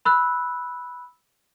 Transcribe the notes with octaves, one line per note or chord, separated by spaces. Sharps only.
B5 E6 F#6